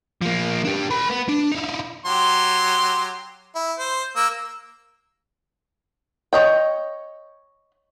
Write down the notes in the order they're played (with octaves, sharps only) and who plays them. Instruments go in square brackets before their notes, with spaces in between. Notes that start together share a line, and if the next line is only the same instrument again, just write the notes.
[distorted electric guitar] F3 A#3
D4 G4
A#4 B5
B3
D4
D#4 E4
[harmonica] F#3 G4 C6
E4
C5
A#3 E6
[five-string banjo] C#5 D#5 G5